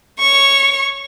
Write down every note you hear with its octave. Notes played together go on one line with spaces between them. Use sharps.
C#5 C#6